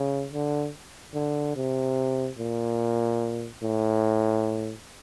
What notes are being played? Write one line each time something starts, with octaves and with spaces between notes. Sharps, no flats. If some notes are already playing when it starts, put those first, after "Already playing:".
Already playing: C#3
D3
D3
C3
A#2
A2